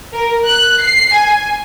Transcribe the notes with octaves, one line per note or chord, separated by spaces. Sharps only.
A#4
F#6
C7
G#5